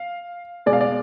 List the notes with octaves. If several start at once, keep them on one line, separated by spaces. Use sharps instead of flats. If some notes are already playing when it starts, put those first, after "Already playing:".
Already playing: F5
B2 G#3 D5
F5
D5